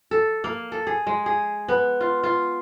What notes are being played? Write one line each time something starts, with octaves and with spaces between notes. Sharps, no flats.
A4
A#3
A4
G#4
G#3
G#4
B3
F4
F4